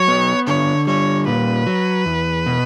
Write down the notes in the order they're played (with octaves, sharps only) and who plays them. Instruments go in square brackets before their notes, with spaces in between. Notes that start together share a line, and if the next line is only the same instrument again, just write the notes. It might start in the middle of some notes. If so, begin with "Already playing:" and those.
Already playing: [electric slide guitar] F#3 [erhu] C#5
[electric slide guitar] B3
[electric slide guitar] D3 [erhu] C#5
[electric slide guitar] G3 [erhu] C#5
[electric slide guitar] A#2 [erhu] B4
[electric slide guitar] F#3
E2
B2